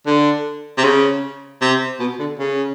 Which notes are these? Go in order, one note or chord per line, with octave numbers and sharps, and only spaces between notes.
D3
C3
C#3
C3
B2
D3
C#3